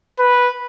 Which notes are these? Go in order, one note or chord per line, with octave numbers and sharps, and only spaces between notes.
B4